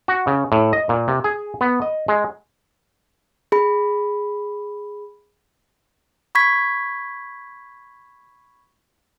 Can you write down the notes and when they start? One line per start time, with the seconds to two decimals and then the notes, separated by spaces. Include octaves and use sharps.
0.08 F#4
0.27 C#3
0.52 A2
0.73 D#5
0.89 A#2
1.08 C3
1.24 G#4
1.61 B3
1.82 D#5
2.08 G#3
3.52 G#4 B5
6.35 B5 C#6 G#6 B6